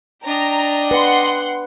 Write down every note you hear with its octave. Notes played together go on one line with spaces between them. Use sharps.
D4 D5 D#5 G5 A#5
B4 F#5 C6